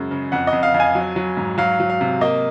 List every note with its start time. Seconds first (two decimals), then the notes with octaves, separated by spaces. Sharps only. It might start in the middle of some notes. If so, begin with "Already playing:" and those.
Already playing: F#2 C#3 G#3
0.11 C#3
0.32 F2 F#5
0.47 D#5
0.53 F2
0.63 F5
0.74 F2
0.80 G#5
0.95 F#3
1.16 F#3
1.37 G#2
1.58 F#3 F5
1.80 F#3
1.90 F5
2.01 C3
2.21 A#3 D#5